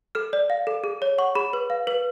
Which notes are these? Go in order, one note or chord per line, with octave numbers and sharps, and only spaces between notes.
A4 F6
D5
F5
A4
G#4
C#5
F#5 C#6
G#4 B5
B4
F5
B4